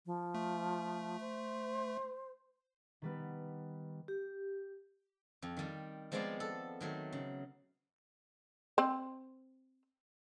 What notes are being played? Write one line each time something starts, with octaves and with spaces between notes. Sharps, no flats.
F3
A3
C5
D#3 G3 B3
G4
F2
D#3 G3
F3 G#3 B3 C4 D5 F5
A4
D#3 F#3 A3
C#3
C4 C5